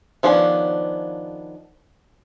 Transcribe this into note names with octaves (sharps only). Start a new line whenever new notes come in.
D#3 F3 B3 C#4 D4